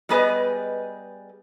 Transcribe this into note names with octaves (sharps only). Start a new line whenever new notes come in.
G3 G#3 B3 G#4 B4 D#5